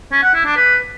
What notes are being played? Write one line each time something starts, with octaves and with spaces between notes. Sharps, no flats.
C#4
F#5
E4
D4
B4